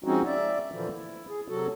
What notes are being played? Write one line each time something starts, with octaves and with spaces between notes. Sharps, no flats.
F3 G#3 C4 C#4 D#4 F#4
D5 E5
A#2 D3 E3 F3
E4
G#4
C3 F#3 F#4 A4